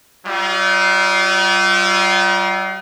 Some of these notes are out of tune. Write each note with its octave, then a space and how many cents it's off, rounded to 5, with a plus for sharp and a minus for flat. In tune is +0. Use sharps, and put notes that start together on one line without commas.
G3 -45 F4 +0 D#5 +0